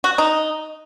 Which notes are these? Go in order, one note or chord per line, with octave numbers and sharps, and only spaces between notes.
F#4
D#4